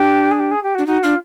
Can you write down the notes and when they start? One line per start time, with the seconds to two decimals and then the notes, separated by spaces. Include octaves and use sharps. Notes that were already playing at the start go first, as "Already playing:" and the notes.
Already playing: D4 G4
0.31 G#4
0.39 G4
0.51 G#4
0.63 G4
0.75 F#4
0.78 D4
0.86 D#4 F#4
1.03 D4 F4